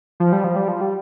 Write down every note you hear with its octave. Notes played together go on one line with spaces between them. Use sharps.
F3
G3
F3
G3
F3
G3